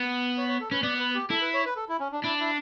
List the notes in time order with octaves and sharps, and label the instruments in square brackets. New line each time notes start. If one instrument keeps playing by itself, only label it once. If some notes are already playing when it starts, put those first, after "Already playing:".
Already playing: [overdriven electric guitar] B3
[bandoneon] C#5
C#5
A4
[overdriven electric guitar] C#4 [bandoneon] B4
[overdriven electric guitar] B3 [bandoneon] D5
[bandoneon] B4
G4
[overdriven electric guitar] E4 [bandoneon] A4
[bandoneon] B4
C#5
B4
A4
E4
C#4
D4
[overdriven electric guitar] D4 [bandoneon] E4
[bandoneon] E4